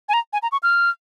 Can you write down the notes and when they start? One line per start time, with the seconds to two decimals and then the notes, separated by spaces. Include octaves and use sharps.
0.09 G#5
0.13 A#5
0.33 G#5
0.42 A#5
0.52 C#6
0.63 F6